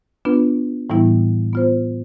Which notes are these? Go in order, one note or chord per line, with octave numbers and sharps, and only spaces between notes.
B3 D4 F4 B4
A2 E3 G3 B3 E4
B3 F4 C5